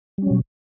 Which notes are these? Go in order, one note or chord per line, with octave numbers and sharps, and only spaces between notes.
B2 F#3 G3 C#4